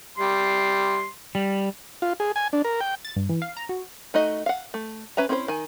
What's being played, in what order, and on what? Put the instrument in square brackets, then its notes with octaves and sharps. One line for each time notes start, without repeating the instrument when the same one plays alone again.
[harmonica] G3 C6
[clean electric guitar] G3
[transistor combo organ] F4
G#4
G#5
D4
A#4
G5
[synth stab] A6
G2
E3
F5
A#5
F#4
[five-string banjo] A3 D#4 F#4 D#5
F5 F#5
A3
C#4 B4 E5 A#5
C4 C#4 E4 A#4 C5
D#3 G#5